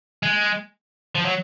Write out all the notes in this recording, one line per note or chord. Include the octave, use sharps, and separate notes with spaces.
G#3
F3
F#3